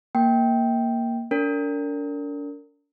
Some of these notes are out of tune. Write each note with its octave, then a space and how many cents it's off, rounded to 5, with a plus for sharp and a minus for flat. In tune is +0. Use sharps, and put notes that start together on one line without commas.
A#3 +0 G5 +0
D4 -40 A#4 -30